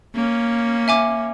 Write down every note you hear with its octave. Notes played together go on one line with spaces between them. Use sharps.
A#3 C#4
E5 G#5 D6